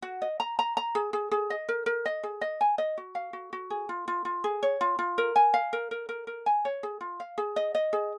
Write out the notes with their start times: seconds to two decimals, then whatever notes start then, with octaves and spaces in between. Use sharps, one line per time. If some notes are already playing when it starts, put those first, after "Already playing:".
0.02 F#4
0.22 D#5
0.40 A#5
0.59 A#5
0.77 A#5
0.95 G#4
1.13 G#4
1.31 G#4
1.50 D#5
1.69 A#4
1.86 A#4
2.05 D#5
2.23 G#4
2.41 D#5
2.61 G#5
2.78 D#5
2.97 F#4
3.15 F5
3.33 F#4
3.53 F#4
3.70 G#4
3.89 F4
4.08 F4
4.25 F4
4.44 G#4
4.63 C#5
4.81 F4
4.99 F4
5.18 A#4
5.36 G#5
5.54 F5
5.73 A#4
5.91 A#4
6.09 A#4
6.27 A#4
6.46 G#5
6.65 C#5
6.83 G#4
7.01 F4
7.20 F5
7.38 G#4
7.56 D#5
7.75 D#5
7.93 G#4